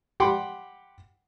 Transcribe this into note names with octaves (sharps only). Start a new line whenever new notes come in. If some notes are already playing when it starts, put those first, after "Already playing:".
G4 F#5 G5 B5 C6 D6